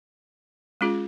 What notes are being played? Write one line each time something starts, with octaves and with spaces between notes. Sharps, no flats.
G#3 C#4 F4 G#4